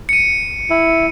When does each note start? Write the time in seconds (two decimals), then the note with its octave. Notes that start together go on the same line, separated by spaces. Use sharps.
0.09 C#7 D#7
0.70 E4